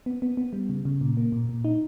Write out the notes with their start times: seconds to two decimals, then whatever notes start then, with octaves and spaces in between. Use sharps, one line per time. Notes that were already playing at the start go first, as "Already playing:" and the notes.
0.06 B3
0.22 B3
0.37 B3
0.53 G3
0.69 C#3
0.85 C#3
1.01 A#2
1.17 A#3
1.32 A#2
1.49 A#2
1.65 D#4